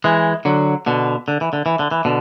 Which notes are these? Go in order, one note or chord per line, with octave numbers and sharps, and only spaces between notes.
E3 G#3
D3 F#3
B2 D3
D3
E3
D3
E3
D3
E3
B2 D3